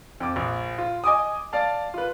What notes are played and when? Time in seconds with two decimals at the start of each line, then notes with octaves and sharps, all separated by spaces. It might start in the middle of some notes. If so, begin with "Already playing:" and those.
0.20 F2 D6
0.36 A#1
0.78 F4
1.04 D#5 G#5 D6 D#6
1.53 D5 F5 A5
1.94 F4 B4